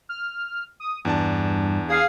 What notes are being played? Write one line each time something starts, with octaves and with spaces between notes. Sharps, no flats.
F6
D#6
E2 G2 D4 A5
G#4 F5